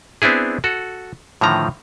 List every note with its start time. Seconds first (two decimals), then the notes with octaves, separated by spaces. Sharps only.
0.22 B3 C4 D4 E4 G#4
0.64 F#4 A4
1.41 A2 D3 D#3 F3 A#5